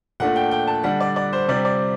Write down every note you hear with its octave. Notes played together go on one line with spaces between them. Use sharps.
A#2 A3 D4 F#5
G5
G5
A5
D3 G3 D4 F#5
D5
D5
C5
C3 G3 C4 D5
D5